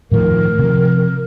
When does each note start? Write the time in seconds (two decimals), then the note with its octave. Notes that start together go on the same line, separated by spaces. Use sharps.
0.12 A2 D#3 F3 A#4
0.59 C3 F3